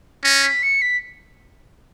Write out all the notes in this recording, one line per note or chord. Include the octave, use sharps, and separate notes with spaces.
C#4 A#6
B6
C#7
B6